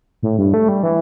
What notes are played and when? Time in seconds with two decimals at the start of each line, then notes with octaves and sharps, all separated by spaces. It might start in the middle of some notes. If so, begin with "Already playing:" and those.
0.23 A2
0.38 G2
0.53 A3
0.68 G3
0.83 E3